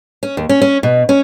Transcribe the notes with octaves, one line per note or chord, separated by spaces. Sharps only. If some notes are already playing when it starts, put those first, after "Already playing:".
C#4
D#2
C#4
C#4
B2
C#4